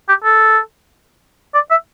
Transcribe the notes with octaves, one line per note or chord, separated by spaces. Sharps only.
G4
A4
D5
E5